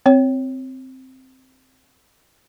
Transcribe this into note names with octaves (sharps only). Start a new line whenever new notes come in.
C4 C#5